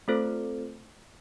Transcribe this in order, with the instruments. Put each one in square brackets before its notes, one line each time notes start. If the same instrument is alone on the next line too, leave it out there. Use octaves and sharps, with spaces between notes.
[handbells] A3 C4 F4 A4 C5